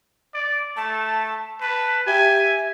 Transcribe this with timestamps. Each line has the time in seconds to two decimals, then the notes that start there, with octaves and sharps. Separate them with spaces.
0.34 D5
0.76 A3 A5
1.61 B4 A5
2.07 G4 E5 G#5